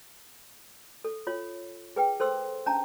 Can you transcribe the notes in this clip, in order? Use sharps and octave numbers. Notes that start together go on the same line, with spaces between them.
A4
F4 C#5
G#4 B4 G5
A4 C5 C6 E6
C#4 D4 A5 A#5